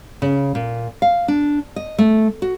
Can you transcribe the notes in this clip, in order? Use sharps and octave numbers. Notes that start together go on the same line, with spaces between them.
C#3
A#2
F5
D4
D#5
A3
F#4